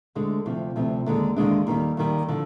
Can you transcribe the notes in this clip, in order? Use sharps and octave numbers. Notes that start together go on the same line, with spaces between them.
D2 D3 G#3
D2 C3 F3
D2 C3 F3
D#2 D3 G#3 D4
D#2 D3 G#3 D4
D#2 D#3 G3
D#2 D#3 G3
D3 F3